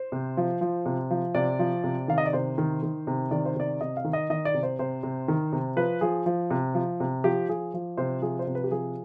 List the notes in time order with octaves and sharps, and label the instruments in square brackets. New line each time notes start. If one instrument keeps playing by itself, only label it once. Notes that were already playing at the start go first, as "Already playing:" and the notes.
Already playing: [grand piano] C5
C3
F3
F3
C3
F3
C3 D5
F3
C3
D#3 F5
D#5
D5
C3 C5
D#3
D#3
C3
D#3 D5
C5
C3 D5
C3 D#5
F5
D#3
D#5
D#3 D#5
D5
C3
C5
C3 C5
C3
D#3
C3
F3 B4
F3 G#4
F3
C3
F3
C3
F3 G4
F3 G#4
F3
C3 C5
F3 G#4
C5
C3
B4
G4
F3 G#4